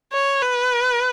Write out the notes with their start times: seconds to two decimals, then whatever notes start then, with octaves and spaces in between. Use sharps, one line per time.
0.13 C#5
0.42 B4